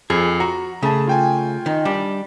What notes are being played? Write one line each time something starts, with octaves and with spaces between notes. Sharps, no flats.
F2 G#4
F#4 A#5
C#3 A3 G#4 A5
F4 G5 G#5
D#3
G3 D4